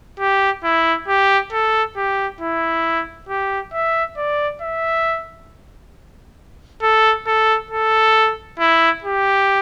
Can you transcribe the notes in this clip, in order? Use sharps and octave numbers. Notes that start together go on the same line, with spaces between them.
G4
E4
G4
A4
G4
E4
G4
E5
D5
E5
A4
A4
A4
E4
G4